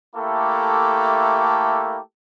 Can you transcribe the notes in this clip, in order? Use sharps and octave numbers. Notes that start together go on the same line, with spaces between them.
A3 A#3 E4 G4 A4